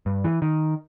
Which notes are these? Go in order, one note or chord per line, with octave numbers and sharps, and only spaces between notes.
G2
E3
D#3